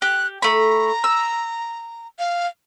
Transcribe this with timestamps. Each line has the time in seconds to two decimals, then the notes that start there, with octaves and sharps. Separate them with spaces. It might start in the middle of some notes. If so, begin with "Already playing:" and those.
0.02 G4 F#6
0.42 A3 A#5 B5
1.04 E6
2.19 F5